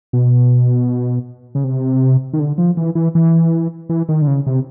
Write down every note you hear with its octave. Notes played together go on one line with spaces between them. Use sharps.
B2
C#3
C3
D#3
D3
F3
E3
E3
E3
E3
D#3
D3
C#3
C3